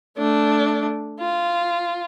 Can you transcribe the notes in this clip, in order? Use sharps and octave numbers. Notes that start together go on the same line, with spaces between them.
A3 D4
F4